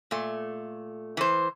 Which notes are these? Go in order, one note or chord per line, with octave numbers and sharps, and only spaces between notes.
A#2 A3
E3 C5